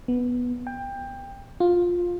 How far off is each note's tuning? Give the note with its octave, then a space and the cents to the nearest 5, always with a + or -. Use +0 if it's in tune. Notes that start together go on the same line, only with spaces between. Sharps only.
B3 -5
G5 +20
F4 +10